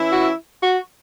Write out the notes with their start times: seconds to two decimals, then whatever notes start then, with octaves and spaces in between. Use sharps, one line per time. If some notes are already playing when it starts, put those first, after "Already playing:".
Already playing: E3 C#4 E4
0.12 F#4
0.63 F#4